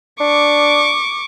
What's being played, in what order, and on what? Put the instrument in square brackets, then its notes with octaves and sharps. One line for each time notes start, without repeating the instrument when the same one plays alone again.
[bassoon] D4 [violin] C#6 D6